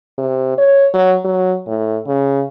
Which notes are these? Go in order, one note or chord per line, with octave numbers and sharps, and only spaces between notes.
C3
C#5
F#3
F#3
A2
C#3